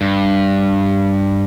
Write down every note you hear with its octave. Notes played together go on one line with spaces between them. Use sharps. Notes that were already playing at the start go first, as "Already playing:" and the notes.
G2